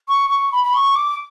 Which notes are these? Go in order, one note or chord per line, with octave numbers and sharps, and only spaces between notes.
C#6
C#6
B5
B5
C#6
D6